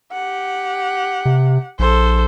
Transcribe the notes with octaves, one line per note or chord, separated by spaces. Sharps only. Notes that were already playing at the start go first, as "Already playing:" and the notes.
G4 F#5
C3
A#1 A4 C5